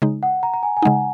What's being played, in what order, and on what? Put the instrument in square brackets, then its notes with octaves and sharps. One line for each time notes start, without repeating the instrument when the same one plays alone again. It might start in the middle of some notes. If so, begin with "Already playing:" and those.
[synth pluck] C#3 G#3 D#4
[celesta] F#5
A#5
A#5
G#5
G#5
[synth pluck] C#3 G#3 D#4 [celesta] F#5